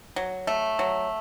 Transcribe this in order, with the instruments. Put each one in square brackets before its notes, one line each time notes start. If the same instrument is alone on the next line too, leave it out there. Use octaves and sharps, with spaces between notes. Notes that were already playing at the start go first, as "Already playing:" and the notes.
[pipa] F#3
A3
F#3